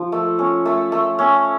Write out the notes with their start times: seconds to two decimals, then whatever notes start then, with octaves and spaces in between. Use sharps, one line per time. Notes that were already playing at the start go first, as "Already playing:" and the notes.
Already playing: F3
0.12 A3
0.39 C#4
0.65 A3
0.92 A3
1.19 C#4